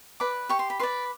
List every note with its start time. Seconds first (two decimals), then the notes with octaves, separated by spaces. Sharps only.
0.20 B4 D5 D6
0.49 G4 C#6
0.59 C6
0.70 B5
0.80 B4 D5 C6